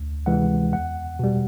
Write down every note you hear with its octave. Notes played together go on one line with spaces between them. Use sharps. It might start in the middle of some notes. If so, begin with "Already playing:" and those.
Already playing: D2
C3 E3 G#3 F#5
E2 F#5
B2 G3